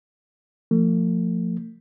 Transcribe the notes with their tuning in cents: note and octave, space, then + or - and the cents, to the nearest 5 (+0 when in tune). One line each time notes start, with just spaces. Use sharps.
F3 +0 A3 +40